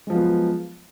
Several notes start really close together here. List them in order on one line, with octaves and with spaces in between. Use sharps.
G#3 F3 F#3 B3